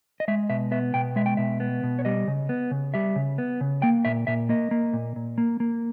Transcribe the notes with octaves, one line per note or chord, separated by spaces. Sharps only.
D#5
G#3 E5
B2 E5
B3 E5
B2 G5
G#3 E5
G5
B2 E5
B3
B2
C#5
G3 D#5
C#3
B3
C#3
G3 E5
C#3
B3
C#3
A#3 G5
A#2 E5
A#2 E5
A#3 D#5
A#3
A#2
A#2
A#3
A#3